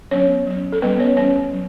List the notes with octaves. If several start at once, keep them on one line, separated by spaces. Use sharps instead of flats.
F#3 B3 C#4 D4 C#5
F#3 C#4
A4
G3 B3 C#4 B4
C#4 C#5
E3 G3 C#4 C#5
F#3